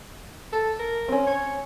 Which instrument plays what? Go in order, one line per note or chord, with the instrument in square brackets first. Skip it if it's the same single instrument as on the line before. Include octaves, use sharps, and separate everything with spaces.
[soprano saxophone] A4
A#4
[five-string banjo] C4 C#4
[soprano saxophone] C#5